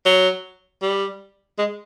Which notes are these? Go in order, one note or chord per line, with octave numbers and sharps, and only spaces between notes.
F#3
G3
G#3